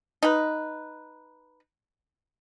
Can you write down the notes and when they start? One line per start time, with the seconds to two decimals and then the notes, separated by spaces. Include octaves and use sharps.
0.23 D#4 B4